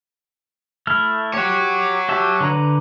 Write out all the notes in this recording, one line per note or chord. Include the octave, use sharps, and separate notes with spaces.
A3 E4 F6
G4 C#5 F#5
G4 E5 A5
D3 B4 A#5